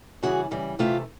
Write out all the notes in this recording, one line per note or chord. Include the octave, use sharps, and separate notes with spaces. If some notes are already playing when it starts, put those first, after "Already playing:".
C#3 E3 G3 F#4 G#4
C#3 E3 G3
C3 E3 A3 F4 G4